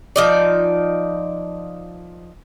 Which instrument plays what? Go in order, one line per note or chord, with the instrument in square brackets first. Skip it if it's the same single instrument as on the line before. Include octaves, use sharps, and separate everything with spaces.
[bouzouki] F3 D#4 D5